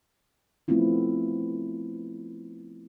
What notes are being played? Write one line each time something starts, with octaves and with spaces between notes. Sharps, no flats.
F3 A3 B3 C4 E4 F4